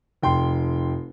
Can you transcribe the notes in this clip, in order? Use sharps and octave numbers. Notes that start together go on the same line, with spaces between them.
F1 G5 C6